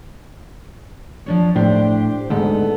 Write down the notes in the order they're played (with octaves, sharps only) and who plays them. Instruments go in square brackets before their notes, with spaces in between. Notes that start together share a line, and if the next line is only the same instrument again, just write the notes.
[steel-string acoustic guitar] F3 D4 C#5
[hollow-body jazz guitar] A2 [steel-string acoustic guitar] D4 G4 C5
[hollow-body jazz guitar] D2 G#2 [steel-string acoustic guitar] B3 A4